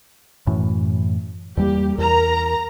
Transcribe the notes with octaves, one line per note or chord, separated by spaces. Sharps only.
F#2 A2 E3
E2 G3 A#3 G4
E2 A#4 A#5